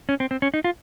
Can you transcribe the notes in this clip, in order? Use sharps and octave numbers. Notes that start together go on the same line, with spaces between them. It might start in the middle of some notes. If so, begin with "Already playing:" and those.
C#4
C4
C4
C#4
D#4
F4